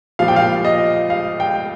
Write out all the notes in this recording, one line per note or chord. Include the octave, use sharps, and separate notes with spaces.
A#2 F3 F5
G5
F5
D#5
F5
G5